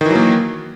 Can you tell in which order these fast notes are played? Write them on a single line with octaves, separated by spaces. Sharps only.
D#3 E3 F#3 A#3